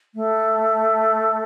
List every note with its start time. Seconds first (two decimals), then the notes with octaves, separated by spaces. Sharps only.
0.15 A3